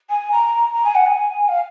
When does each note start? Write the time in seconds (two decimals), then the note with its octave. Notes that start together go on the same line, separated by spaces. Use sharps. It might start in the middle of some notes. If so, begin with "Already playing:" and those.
0.09 G#5
0.31 A#5
0.73 A#5
0.84 G#5
0.94 F#5
1.05 G#5
1.48 F5